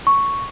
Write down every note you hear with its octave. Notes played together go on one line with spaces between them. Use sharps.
C#6